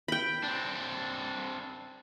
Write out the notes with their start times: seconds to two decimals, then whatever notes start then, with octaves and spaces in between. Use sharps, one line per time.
0.08 G5 B5
0.43 C4 D4